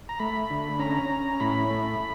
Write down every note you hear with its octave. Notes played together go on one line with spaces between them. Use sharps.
A#5
A3 B5
D3
C#4 A#5
C#4
A2 B5
A3